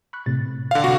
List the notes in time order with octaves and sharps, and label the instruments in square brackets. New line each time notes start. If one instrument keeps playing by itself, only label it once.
[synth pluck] B5 C#6 F#6
A2 C3 A6
[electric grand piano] D3 F5
[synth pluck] C3 [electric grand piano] F#4